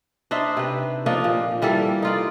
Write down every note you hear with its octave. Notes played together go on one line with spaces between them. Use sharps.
D4 D#4 C5 E5
C3 B4
F3 A#3 D4 D#4
A#2
E3 G3 A#3 A4
D#4 F4 D5